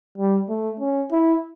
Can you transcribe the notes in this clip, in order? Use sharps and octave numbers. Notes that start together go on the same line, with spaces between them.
G3
A3
C#4
E4